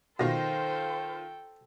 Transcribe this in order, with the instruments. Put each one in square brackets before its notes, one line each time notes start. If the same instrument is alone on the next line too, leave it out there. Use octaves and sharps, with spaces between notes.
[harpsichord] B1 [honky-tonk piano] D#3 F4 A#6 [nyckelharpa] A4 G5 [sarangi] C5